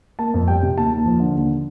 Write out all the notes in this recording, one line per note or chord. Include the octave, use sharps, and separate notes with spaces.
A#3 A5
F2
G3 G5
C3
D#2 A5
D#2
F3
D3
D#2